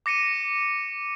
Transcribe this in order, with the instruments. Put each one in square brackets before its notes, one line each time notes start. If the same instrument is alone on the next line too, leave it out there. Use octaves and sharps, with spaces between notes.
[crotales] D6 A#6 C#7 D#7